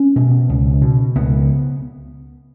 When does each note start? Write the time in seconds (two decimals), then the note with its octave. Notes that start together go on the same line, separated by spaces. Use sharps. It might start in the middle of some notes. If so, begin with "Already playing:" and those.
Already playing: C#4
0.16 B2
0.49 C#2
0.82 B2
1.15 C#2 B3